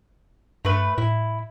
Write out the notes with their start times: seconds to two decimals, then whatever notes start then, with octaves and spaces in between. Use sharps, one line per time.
0.65 G2 A3 B4
0.98 A2 E4